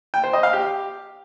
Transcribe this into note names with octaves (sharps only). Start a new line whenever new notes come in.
G5
C5
D#5
F5
G4